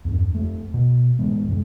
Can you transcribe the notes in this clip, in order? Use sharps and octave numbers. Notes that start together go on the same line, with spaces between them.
E2 G2 C4 D4
F2 A3
B2
A2 E3 G#3 B3
F#2 C3 G#3